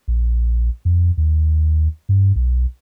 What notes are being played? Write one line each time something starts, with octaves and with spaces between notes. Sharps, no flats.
A#1
F2
D#2
G2
B1